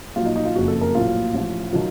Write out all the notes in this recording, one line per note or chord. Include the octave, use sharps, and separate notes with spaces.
A#1 A#2 F#3 F4
D#4
D#4
F4
F#1 F2 C#3 F3 F#4
A4
A#4
A#1 A2 F#3 F4
A1 A2 F3
D#3 F#3